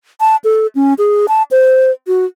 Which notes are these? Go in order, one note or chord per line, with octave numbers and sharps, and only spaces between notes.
A5
A4
C#4
G#4
A5
C5
F#4